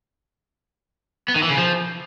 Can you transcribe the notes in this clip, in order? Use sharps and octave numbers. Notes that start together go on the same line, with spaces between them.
B3
D#3
E3
C#3
F3